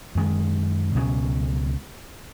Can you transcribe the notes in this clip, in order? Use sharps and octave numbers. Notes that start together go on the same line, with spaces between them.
F#2 D#3 G#3
C#2 B2 F#3 C#4